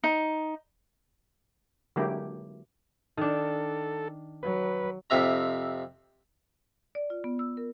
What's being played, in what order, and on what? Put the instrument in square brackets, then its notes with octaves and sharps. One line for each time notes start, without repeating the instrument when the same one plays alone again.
[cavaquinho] D#4
[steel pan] D3 F#3 G#3 A#3 E4 G4
[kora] D#3 D4 [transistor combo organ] A4
[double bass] F#3 [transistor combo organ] B4
[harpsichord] F2 C3 E5 A#5
[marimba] D5
F4
B3
E6
A#4